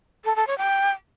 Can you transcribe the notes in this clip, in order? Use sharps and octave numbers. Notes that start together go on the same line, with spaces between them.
A4
A4
C#5
G5